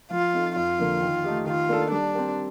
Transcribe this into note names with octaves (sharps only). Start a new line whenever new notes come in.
F3 F4
C4 D#4 A4
F2 F4
D3 F3 A#3
D#3
A3 D#4 G4
D#3 F4
A#3 D4 A4
G3 D4
C4 G4 A#4